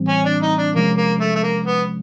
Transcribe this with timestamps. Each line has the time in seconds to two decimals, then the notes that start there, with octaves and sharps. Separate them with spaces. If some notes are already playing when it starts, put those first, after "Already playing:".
Already playing: A2 E3 G3 C4
0.09 C#4
0.25 D4
0.42 D#4
0.59 D4
0.75 C3 F3 G#3 A#3 C#4
0.98 A#3
1.21 A3
1.36 A3
1.43 A#3
1.65 B3